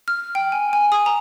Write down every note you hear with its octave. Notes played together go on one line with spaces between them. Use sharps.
F6
G5
G#5
G#5
D#6
A#5